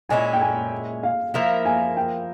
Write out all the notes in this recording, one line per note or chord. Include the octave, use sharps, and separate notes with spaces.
A#2 G#3 C#4 E4 G#5
G5
G#5
F5
F3 A#3 E4 A#4 E5
G#5
G5